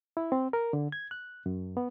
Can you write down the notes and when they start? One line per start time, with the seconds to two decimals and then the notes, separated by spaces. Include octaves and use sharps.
0.17 E4
0.32 C4
0.53 A#4
0.73 D3
0.92 G#6
1.11 F#6
1.46 F#2
1.77 B3